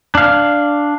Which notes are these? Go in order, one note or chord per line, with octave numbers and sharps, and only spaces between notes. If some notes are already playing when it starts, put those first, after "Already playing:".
D4 F5